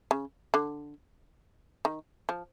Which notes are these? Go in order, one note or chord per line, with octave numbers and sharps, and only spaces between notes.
C#3
D3
D#3
F3